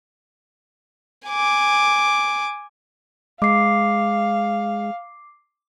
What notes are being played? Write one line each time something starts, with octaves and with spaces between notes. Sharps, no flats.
G#5 D6
G#3 F5 D6 C7